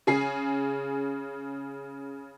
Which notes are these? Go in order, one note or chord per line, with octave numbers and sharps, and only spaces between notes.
C#3 G#4 C7